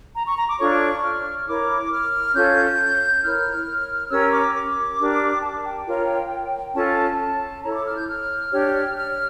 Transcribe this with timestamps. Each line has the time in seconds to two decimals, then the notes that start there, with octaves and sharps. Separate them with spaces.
0.14 A#5
0.26 C#6
0.36 A#5
0.47 D6
0.58 D4 F4 A4 C#5 C#6
1.03 F6
1.46 E4 A#4 C#5 D6
1.90 F6
2.34 C#4 F4 A4 C#5 G6
3.22 E4 A#4 C#5 F6
4.10 C#4 G4 A#4 C#5 E6
4.32 D6
4.54 D6
4.98 D4 G4 A#4
5.42 A5
5.64 G5
5.86 F4 A#4 C#5
6.74 C#4 F4 A4 A5
7.18 A5
7.62 E4 A4 C#5 A#5
7.69 C#6
7.73 D6
7.85 F6
7.95 G6
8.06 F6
8.50 D4 G4 C#5
8.94 F6